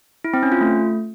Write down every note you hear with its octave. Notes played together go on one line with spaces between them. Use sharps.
E4
C4
C#4
F4
A3